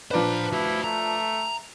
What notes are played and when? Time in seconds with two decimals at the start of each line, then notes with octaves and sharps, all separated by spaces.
0.11 F3 D4 B4 C5 A#5
0.53 E4 F#4 C5
0.84 A3 A#5